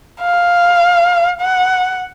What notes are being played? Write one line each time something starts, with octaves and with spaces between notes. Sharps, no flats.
F5
F#5